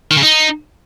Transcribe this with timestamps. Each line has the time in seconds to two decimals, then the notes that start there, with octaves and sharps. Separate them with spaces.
0.11 D#3
0.17 C#3
0.23 D#4